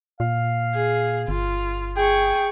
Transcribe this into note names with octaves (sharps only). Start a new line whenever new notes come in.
A#2 F5
G#4
G1 F4
G#4 G5 C#6